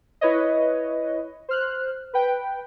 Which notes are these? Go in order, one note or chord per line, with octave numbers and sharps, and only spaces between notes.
E4 B4 C#5 D#5
C5 F6 F#6
B4 G5